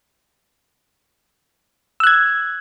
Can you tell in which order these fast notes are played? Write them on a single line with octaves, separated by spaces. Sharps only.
E6 F#6 G#6